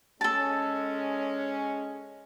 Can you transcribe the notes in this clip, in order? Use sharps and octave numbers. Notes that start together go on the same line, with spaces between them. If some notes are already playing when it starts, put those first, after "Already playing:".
G#3 C#4 A4 A5